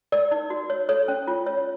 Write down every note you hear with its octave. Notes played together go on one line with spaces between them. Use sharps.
A#4 D5
D#4
F#4
C#5
A4 C#5
C#4
F4
C#5